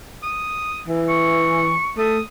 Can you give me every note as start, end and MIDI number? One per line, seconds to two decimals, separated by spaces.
0.23 0.81 87
0.88 1.76 52
1.09 1.90 85
1.98 2.20 57
1.98 2.22 87